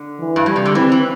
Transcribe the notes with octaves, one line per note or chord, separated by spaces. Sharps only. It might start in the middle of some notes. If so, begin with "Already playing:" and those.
Already playing: D3
E3
G2
A2 G3
C3
D3
E3 C4
E3